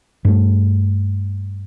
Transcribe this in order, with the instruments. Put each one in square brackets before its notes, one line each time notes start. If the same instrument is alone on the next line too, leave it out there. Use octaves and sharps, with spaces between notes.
[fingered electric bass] G2 A3